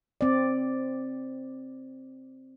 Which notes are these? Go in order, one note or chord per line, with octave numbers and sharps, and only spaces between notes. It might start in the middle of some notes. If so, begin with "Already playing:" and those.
C4 D5